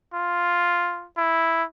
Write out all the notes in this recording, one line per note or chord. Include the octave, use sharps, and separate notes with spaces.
F4
E4